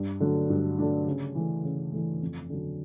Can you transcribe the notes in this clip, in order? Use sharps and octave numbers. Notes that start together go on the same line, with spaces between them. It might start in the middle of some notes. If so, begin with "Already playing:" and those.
Already playing: G2
D3 F#3 A3 D4
G2
D3 F#3 A3 D4
C#3
E3 A3
C#3
E3 A3
F2
D3 F#3